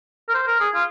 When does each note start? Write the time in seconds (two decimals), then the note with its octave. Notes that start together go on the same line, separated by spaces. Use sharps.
0.28 A#4
0.34 C5
0.47 A#4
0.60 G#4
0.74 F4